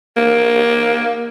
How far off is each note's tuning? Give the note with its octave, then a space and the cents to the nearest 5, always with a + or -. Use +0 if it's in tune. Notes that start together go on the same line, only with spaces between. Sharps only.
A#3 +15